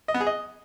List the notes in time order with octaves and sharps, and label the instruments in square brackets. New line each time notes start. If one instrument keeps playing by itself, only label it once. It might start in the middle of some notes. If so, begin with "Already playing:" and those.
[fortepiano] D#5
B3
G#4
D#5